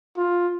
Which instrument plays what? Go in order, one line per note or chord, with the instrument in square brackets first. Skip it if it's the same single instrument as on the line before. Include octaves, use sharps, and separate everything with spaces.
[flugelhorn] F4